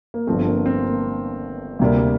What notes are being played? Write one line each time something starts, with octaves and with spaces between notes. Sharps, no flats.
A#3
G1 G2 F3 A3 C4
A#3
C4
A#3
D2 C3 G3 A#3